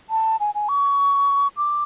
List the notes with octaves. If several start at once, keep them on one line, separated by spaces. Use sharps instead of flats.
A5
G#5
G#5
C#6
D6